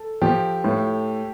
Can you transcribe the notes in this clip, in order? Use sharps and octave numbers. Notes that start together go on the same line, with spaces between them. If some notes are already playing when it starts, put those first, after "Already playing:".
Already playing: A4
F3 G4
A2